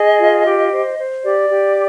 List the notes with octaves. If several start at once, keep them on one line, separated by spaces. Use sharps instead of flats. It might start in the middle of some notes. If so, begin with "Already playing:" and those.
Already playing: G#4 D#5
F4
G4
C5
C5
G4 D5
G4